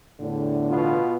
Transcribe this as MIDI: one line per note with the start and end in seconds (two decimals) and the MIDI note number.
0.20 1.00 40
0.20 1.00 45
0.20 1.00 50
0.70 1.16 47
0.70 1.16 59
0.70 1.16 65